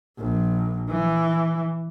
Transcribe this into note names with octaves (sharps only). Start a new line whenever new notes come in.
A#1
E3